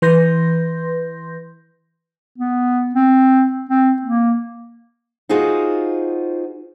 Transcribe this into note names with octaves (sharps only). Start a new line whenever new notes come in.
E3 B4 C6 G6 A#6
B3
C4
C4
A#3
D#4 F4 F#4 G#4 C5 F#5